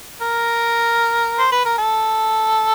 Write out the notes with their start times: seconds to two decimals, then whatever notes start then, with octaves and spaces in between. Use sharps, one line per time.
0.22 A#4
1.39 C5
1.52 B4
1.65 A#4
1.78 A4